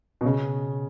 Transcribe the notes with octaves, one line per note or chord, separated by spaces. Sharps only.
B2
C#3